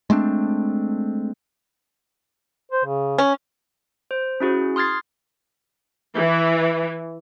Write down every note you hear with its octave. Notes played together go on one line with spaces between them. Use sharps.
G#3 A3 C4 D4
C5
C#3
C#4
C5
C#4 E4 F#4 G#4
C6 D#6 F6 G#6 A6 C7
E3